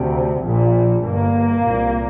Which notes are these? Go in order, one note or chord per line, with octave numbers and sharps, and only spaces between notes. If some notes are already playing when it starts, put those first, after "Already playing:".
Already playing: D2 C3
A#1 A#2
G1 G2 A#3
C2 A#2